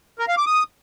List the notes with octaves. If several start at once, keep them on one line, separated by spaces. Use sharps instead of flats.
A#4
F5
D6
D#6